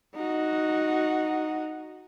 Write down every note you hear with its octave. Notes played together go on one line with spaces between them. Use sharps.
D#4 F#4